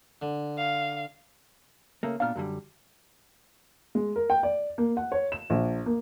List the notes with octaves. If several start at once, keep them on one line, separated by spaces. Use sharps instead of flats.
D3
F5
C#3 A3 A#3
A#2 B3 D4 F5 F6
F#2 D3 G3
G#3
A#4
G5
D5
A#3
F#5
C#5
E7
A#1
A#3